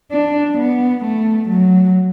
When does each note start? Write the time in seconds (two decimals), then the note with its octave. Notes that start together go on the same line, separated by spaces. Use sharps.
0.12 D4
0.58 B3
1.04 A3
1.49 F#3